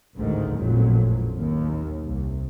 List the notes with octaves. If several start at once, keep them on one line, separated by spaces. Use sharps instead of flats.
A1 D2 G#2 D#3
A1 F2 A#2 F#3
D#2
C2